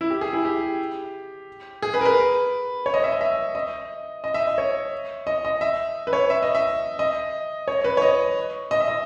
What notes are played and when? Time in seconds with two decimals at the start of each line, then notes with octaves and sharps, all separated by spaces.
0.01 E4
0.10 G4
0.21 G#4
0.33 E4
0.45 G4
1.82 G#4
1.94 B4
2.01 A#4
2.05 B4
2.86 C#5
2.94 D#5
3.04 E5
3.12 D#5
3.21 E5
3.55 D#5
4.24 D#5
4.34 E5
4.47 D#5
4.58 C#5
5.27 D#5
5.45 D#5
5.61 E5
6.07 B4
6.13 C#5
6.30 E5
6.43 D#5
6.55 E5
6.99 D#5
7.68 C#5
7.84 B4
7.97 C#5
8.02 D#5
8.71 D#5
8.80 E5
8.88 D#5